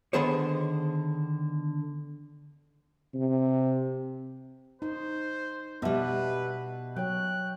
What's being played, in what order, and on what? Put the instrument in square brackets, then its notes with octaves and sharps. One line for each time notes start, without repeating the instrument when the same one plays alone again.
[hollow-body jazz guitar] D3 D#3 B3 G#4 C5 C#5
[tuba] C3
[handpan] D#4 [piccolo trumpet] C5
[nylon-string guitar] B2 G3 [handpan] B3 [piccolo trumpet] B4 [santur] D#5 E5 A5
[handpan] F#3 C#5 [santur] G5 [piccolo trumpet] F#6